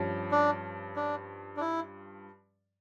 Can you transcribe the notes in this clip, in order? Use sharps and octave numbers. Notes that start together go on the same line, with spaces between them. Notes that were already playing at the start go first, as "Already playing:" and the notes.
Already playing: G2 F3 C#4
D4
D4
D4
E4